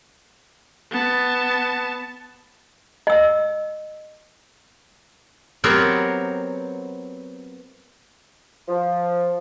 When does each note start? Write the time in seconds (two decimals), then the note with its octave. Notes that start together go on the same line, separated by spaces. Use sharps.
0.91 B3 A5
3.07 D#5 E6
5.64 F#3 B3 C4 G4 A#4 C#5
8.68 F3